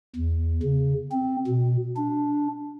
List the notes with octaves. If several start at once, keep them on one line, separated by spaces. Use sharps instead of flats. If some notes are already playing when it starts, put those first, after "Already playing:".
E2
C#3
C4
B2
D4